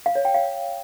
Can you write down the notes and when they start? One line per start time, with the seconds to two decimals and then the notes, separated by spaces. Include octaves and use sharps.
0.06 F5
0.15 C#5
0.25 G5
0.34 F5